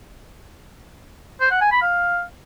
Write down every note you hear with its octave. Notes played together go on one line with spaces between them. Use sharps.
C5
F#5
G#5
B5
F5